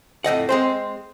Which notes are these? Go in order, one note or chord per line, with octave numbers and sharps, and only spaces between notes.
F2 A2 D#5 F#5
G#3 C4 C5